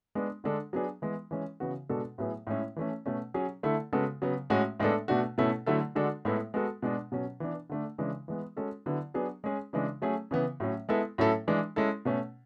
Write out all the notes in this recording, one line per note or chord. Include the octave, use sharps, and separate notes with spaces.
G#3 B3 D4
D3 G#3 D4 A4
F#3 B3 D4 G#4
E3 G#3 B3
E3 G#3 C#4
C#3 E3 B3 F#4
B2 G#3 D4 F#4 A4
A2 F#3 B3 E4 G#4
A2 G#3 C#4 E4
E3 A3 C#4
B2 A3 C#4
F#3 C#4 G#4
D3 A3 E4 A4
C#3 G#3 B3 F#4 A4
C#3 F#3 B3
A2 G#3 C#4 F#4
A2 G#3 B3 D4 A4
B2 A3 D4 F#4
B2 A3 C#4 E4 A4
D3 F#3 A3 E4 A4
D3 G#3 D4 F#4 A4
A2 G#3 B3 E4 A4
G#3 B3 F#4 A4
B2 G#3 D4
B2 F#3 C#4
E3 B3 D4
D3 A3 D4
C#3 E3 G#3 D4
E3 G#3 B3
G#3 C#4 F#4 A4
D3 F#3 B3 E4
F#3 B3 D4 G#4
G#3 C#4 G#4
C#3 E3 G#3 D4
F#3 A3 C#4 G#4
C#3 E3 B3
A2 F#3 C#4
G#3 B3 E4 A4
A2 F#3 C#4 E4 A4
E3 G#3 D4
G#3 C#4 E4 A4
B2 A3 C#4